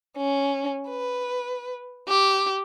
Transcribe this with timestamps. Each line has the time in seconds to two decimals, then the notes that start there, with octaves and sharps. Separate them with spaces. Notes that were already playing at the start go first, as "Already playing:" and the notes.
0.17 C#4
0.89 B4
2.09 G4